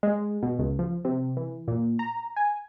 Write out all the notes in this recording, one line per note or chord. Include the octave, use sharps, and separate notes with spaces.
G#3
B2
C#2
F3
C3
E3
A#2
A#5
G#5